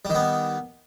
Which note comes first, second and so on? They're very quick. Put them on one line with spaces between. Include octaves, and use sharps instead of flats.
G3 D#3 B3